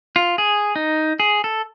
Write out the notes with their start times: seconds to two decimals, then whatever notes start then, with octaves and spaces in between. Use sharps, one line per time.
0.16 F4
0.38 G#4
0.76 D#4
1.20 G#4
1.44 A4